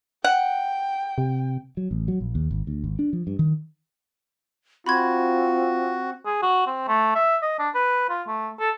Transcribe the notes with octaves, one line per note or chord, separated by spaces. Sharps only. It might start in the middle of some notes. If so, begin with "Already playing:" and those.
F#5 G5
C3
F#3
A1
F#3
A#1
D#2
G#1
D2
G#1
D4
F3
G2
D#3
C4 F4 F#4 B5 C6 G#6
G#4
F#4
C4
A3
E5
D#5
D4
B4
F4
A3
A4